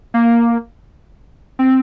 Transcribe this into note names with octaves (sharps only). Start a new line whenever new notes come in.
A#3
C4